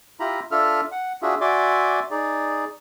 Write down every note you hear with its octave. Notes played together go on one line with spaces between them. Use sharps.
E4 F4 G4 A#5 B5
D4 F4 A4 E5 F6
F#5
D4 F4 F#4 G#4 E5
F#4 D5 E5 G#5 C6 D6
D#4 G#4 D5